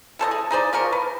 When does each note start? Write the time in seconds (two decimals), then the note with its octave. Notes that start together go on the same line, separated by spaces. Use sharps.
0.19 E3 A4 C5 D#5
0.31 G#4
0.51 D#4 G#4 C5 D5
0.73 C#3 F3 A#4 C#6
0.93 B4